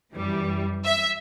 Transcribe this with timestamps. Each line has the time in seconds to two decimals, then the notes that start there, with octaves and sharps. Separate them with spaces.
0.13 F#2 E3 G3
0.84 E5